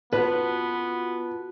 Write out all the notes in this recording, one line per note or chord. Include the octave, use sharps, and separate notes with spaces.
B3 F4 F#4 A4 B4